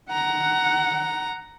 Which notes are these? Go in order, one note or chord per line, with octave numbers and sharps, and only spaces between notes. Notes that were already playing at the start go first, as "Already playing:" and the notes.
F#5 A#5